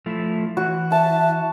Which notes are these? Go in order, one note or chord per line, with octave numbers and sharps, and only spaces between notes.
F3 A3 E4
E3 F#4
E5 A5